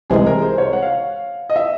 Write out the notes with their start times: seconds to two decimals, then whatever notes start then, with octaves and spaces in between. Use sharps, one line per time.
0.10 C2 C3 E3 G#3 G#4
0.26 A#4
0.42 C5
0.58 C#5
0.73 F#5
0.82 F5
1.50 D#5
1.56 E5